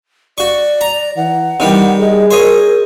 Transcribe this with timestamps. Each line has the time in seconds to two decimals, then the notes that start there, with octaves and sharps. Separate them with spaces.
0.38 F#4 D5 C#6
0.81 A#5
1.17 E3 F#5
1.60 C3 D#3 E3 G3
2.00 G#4 D#5
2.31 A#4 C5 C#5 D#5